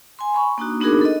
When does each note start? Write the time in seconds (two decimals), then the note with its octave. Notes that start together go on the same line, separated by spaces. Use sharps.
0.19 G#5 C6
0.35 B5 C#6
0.58 A#3 D4 D#4 F#4
0.80 B3 D4 D#4 F#4 G#4 A#4
1.01 A4 D#5